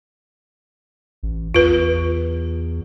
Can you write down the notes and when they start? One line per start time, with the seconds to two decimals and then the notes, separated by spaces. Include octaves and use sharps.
1.23 A1
1.54 E2 F4 B4